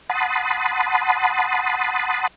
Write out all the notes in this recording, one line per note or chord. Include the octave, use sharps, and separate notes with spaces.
F#5 A5 B5 C6 D#6